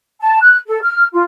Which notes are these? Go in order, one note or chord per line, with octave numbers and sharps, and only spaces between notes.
A5
F#6
A4
F6
F4